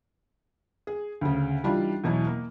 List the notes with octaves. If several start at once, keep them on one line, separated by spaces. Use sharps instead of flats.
G#4
D2 C#3
E3 G3 D4 D#4 F4
E2 B2 E3 F#3
A#3